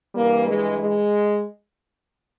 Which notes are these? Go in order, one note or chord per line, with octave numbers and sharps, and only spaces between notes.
G2 E3 G3 A#3
G#3
G#3